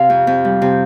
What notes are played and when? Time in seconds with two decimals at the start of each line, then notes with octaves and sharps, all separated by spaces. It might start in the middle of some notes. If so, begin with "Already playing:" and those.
Already playing: C3 F5
0.10 F2
0.27 F2
0.45 G3
0.62 C3